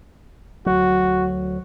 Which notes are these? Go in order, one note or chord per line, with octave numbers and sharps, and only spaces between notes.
D2 F#3 F#4